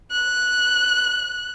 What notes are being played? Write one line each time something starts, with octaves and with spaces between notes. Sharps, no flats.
F#6